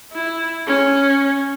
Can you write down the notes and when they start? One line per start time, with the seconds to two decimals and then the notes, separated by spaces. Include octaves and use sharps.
0.13 E4
0.67 C#4